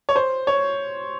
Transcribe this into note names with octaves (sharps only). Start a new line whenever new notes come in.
C#5
C5
C#5